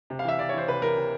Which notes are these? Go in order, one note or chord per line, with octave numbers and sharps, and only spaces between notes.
C3
F5
E3 E5
C3 D5
C#5
E3 C5
C3 B4
E3 A#4
C3